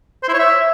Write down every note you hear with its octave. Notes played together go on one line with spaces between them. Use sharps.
C5
E4
C#5
E5